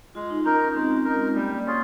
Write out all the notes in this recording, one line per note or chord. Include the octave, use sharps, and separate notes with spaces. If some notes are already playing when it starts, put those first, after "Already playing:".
G#3 F4
D#4
C#4 D#4 A#4
C#4
G#3 C4
D#4 A#4
G#3
G3 A#3
A#3
C#4 F4 G#4